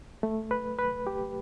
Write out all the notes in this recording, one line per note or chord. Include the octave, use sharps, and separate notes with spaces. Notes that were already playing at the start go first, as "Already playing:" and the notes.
A3
B4
B4
G4